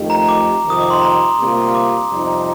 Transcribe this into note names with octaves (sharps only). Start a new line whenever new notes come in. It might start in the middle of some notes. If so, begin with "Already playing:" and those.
Already playing: F2 D#3 A3 D#4 G4
A#5
D6
F2 C3 D#3 D#6
D6
C6
A#5
C3 G3 A#3 F4
D6
F2 C3 G3 C4 D#4